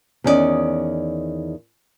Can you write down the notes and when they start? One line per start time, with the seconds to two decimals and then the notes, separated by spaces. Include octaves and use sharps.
0.24 E2 D#3 C#4 F4 D5 D#5